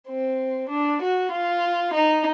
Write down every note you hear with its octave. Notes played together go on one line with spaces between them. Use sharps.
C4
D4
F#4
F4
D#4